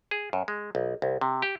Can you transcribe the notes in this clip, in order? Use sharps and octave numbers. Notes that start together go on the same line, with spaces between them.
G#4
F#2
G#3
B1
C2
C3
G4